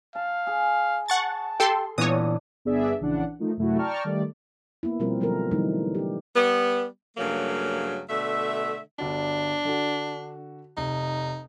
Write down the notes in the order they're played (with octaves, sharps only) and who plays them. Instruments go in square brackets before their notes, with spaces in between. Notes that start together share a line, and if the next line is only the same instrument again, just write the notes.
[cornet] F5 [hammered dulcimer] A5
[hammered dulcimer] G#4
[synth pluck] F#5 C#6 A6 [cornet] A5
[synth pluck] G4 A4 C6 [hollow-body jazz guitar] G5
[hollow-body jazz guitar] A#2 E3 B3 [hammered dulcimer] D4 [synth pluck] C#5 D#6
[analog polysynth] G1 B3 D4 G#4 D5 E5
A#1 C#3 E3 D4 F#5
D#3 F3 A3 D#4
F#2 C3 A3 E4 F#4
D5 G5 A5 A#5 C#6 F6
D#3 G3 A3 D5
[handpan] A#3 B3 E4
B2 F3 G3 C4 F4 A#4
D3 F3 F#3 B3 A4 A#4
D3 E3 F#3 G3 A3 D#4
D4 G4
[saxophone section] G3 B3
G2 C#3 F#3 A3 A#3
B2 D3 A3 E5
[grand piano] G1 F#4 D5 [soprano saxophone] D4
[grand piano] D3 F#4
[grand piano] F1 [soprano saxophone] D#4